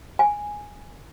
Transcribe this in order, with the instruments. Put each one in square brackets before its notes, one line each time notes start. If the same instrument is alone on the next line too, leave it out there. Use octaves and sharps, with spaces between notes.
[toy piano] G#5